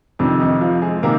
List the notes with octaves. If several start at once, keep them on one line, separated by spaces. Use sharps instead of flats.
F2 C3 D#3 D4
D#3 D#4
F3 F4
G#3 G#4
C3 D#3 A#3 A#4